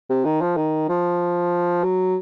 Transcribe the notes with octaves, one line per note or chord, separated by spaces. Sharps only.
C3
D#3
F3
D#3
F3
F#3